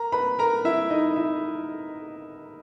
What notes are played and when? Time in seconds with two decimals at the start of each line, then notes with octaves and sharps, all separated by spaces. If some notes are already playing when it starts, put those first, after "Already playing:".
Already playing: A#4 A#5
0.12 B4 B5
0.39 A#4 A#5
0.65 E4 E5
0.90 D#4 D#5
1.16 E4 E5